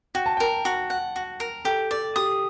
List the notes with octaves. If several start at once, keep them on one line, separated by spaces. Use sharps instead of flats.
F#4 G5
A5
A#4 G5
F#4
F#5
F#4
A#4
G4 A4
A4 D5
G4 D#6